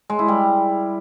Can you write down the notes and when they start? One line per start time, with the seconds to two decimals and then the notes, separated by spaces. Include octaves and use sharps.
0.10 G#3
0.19 E4
0.28 G3